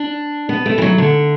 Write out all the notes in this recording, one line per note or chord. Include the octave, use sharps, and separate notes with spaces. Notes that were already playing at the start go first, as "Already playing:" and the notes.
Already playing: D4
B3
A3
E3
F#3
D3